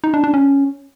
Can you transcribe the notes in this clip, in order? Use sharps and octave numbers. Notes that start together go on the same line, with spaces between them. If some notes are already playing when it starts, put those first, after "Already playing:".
D#4
D4
D4
C#4